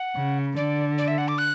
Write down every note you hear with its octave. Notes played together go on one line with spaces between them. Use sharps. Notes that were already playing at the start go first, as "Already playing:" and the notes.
Already playing: F#5
C#3
D3 D5
D5
E5
F#5
D6
F#6